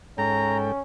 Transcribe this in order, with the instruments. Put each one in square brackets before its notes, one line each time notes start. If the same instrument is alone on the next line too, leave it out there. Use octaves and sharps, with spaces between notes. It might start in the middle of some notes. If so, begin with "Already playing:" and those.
[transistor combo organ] G#2 A4 G5 [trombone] C#4 [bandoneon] A#5